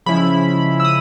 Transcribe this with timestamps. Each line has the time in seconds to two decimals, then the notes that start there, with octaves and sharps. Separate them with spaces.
0.06 C#3 F3 G#3 C#4 E4 B5
0.80 E6
0.85 D#6